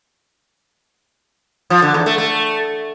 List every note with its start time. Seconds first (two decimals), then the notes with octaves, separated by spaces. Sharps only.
1.70 F3
1.82 D3
1.94 E2
2.06 A3
2.18 A3